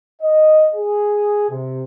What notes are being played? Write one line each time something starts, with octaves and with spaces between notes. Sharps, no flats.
D#5
G#4
C3